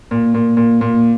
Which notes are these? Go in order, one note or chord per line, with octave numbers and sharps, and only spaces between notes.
A#2
A#2
A#2
A#2